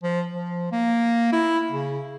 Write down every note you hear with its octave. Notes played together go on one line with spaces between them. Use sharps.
F3
F3
A#3
E4
C#3